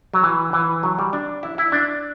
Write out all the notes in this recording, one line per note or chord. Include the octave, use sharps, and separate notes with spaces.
F#3
E3
E3
F#3
G3
D4
E4
E4
D4